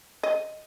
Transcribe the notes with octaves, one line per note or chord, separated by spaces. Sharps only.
D#5